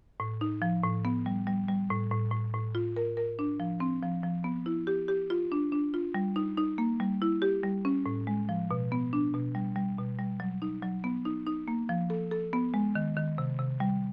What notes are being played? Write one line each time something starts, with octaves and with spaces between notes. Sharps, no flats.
A2
D#4
F3
A2
B3
G3
G3
G3
A2
A2
A2
A2
F4
A#4
A#4
D4
F3
C4
F3
F3
B3
E4
G4
G4
F4
D4
D4
F4
G3
D#4
D#4
A#3
G3
E4
G4
G3
C#4
A2
G#3
F3
B2
B3
D4
B2
G3
G3
B2
G3
F#3
D#4
F#3
B3
D#4
D#4
A#3
F3
A4
A4
B3
G#3
D#3
D#3
C3
C3
G3